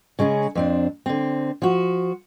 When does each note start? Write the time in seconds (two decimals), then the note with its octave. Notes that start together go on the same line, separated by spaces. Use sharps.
0.19 C#3 G#3 C#4 G#4
0.55 F2 C4 D4
1.06 D3 C4
1.62 F3 F#4